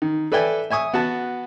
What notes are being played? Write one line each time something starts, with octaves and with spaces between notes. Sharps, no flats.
D#3
A4 B4 D5 E5 G5 G#5
E5 G#5 C#6 D#6
B3 F#4 A5